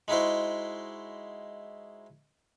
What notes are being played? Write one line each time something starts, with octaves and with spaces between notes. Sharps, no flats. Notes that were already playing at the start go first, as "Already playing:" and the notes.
G#3 D#4 E4 F#4 C5